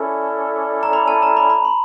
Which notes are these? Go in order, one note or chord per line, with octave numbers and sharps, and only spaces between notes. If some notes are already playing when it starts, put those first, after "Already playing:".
Already playing: C#4 E4 A4 D5
A#5
B5
A5
A#5
B5
B5
C6